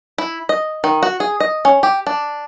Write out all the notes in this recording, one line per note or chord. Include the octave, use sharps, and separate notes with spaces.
E4
D#5
D#3
F#4
G#4
D#5
C#4
G4
D4